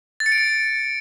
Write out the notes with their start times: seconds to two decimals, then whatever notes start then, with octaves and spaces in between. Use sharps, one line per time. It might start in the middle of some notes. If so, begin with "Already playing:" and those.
0.20 A6
0.26 C#7
0.32 D7
0.38 C#7